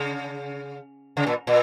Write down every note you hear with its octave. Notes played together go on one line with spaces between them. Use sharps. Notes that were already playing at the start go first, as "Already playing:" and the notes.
Already playing: C#3
C#3
A#2
A#2